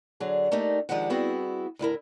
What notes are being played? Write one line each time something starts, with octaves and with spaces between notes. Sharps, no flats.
D3 F#3 G#4
A3 A#3 D4 D#4 G4
D#3 F3 G#3 D4 G4 F#5
G3 B3 C4 E4 F#4 G#4
D2 A2 E4 A#4